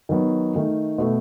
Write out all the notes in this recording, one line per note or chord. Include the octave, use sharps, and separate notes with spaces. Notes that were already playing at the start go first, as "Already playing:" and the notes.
D#3 F#3 B3
D#3 A3
B2 A3